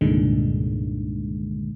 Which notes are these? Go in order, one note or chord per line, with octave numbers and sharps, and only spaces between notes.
C2 G2 A#2 D3 D#3 G#3